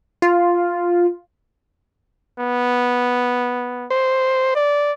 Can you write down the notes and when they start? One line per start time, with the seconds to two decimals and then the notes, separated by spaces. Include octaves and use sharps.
0.22 F4
2.39 B3
3.90 C5
4.56 D5